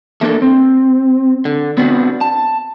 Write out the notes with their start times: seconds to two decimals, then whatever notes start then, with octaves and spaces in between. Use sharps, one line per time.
0.21 A3 A#3 D4 A4
0.42 C4
1.45 D3
1.78 B3 C4 D4 F#4 B4
2.21 A5